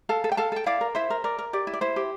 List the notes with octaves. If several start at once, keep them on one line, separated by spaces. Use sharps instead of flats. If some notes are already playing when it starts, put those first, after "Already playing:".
A4 F5 A5
A4
G5
A4 F5 A5
A4 G5
E4 D5 F5
A#4
E4 C5 E5
A#4
A#4 D5
A#4
G4 D5
E4
D5
E4 C5
G4